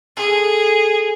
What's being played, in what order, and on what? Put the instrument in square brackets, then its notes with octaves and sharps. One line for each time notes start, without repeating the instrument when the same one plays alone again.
[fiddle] G#4 [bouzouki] A4